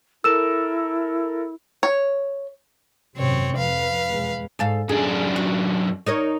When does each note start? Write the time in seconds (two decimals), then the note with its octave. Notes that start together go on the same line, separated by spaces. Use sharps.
0.24 E4 A4 A#4 E6 E7
1.83 C#5
3.17 G#1 F#2 C3 C4 C#5
3.57 F2 B4 F5
4.08 E2 B2 G#3
4.59 G#2 A4 F5
4.89 F#2 D4 G#4
5.36 F#4
6.07 D#4 A#4 C#5